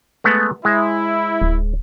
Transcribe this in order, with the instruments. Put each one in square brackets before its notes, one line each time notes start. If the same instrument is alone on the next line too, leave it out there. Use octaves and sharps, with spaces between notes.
[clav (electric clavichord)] G#3 A3 B3
[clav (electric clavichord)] G#3 C5 [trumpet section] E4
[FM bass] D1